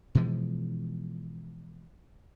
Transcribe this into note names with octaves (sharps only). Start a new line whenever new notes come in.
B2 E3 F3 G#3